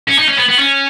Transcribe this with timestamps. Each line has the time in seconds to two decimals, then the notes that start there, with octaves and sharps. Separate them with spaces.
0.08 C#4
0.18 D#4
0.28 C#4
0.38 B3
0.49 B3
0.59 C#4